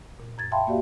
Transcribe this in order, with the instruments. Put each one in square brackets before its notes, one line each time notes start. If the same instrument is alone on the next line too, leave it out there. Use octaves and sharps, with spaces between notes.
[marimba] A#2
F#2 G#6 A6
E5 F5 G5 A5 B5 C6
A#3 F#4 G4 D5 E5 F5